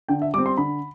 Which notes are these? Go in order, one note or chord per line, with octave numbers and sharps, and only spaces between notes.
D3 G5
E5
G3 C4 D6
C6
D3 B5